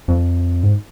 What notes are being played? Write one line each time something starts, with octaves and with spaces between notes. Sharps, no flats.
F2
G#2